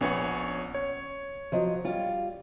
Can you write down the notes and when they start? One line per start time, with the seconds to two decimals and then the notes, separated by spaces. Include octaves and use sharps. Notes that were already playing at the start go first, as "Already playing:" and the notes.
0.01 A#1 B3 C#4 C#5 F#5
0.75 C#5
1.52 F3 F#3 D#5
1.84 G3 F4